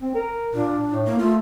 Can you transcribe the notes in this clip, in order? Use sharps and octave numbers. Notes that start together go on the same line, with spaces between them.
C4
A#4
A#2 D4
A2
A#3
A3 F4